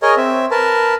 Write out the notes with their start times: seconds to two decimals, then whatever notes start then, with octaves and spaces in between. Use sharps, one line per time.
0.02 G#4 A#4 C#5 D#5
0.17 C4 E5
0.51 A#4 B4 A5